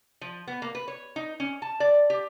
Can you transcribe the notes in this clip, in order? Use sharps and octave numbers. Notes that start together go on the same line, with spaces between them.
F3
B3
A#3
B4
C#5
D#4
C#4
A5
D5
G4